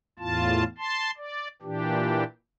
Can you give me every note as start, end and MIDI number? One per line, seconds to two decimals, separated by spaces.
0.19 0.64 40
0.19 0.64 45
0.19 0.64 65
0.19 0.64 81
0.78 1.11 81
0.78 1.11 84
1.17 1.48 74
1.62 2.24 46
1.62 2.24 52
1.62 2.24 62
1.62 2.24 67